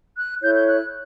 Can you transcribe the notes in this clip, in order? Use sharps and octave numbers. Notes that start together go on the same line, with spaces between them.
F#6
E4 A4 C#5 G6
G6
F#6